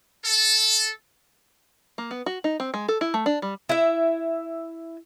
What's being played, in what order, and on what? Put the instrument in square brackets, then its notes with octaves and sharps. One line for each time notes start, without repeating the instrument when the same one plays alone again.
[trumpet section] A4
[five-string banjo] A#3
B3
F#4
D#4
C4
G#3
A4
E4
A3
D4
G3
[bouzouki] E4 E5